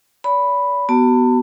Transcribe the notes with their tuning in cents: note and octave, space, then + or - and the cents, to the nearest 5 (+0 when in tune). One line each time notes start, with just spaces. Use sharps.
D5 -45 B5 +0
B3 +0 F#4 +30 A5 +35